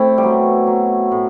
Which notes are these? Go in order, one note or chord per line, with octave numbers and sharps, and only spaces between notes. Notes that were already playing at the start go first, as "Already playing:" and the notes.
Already playing: A3 C4 E4
G3
B2 F#3
F#3
A2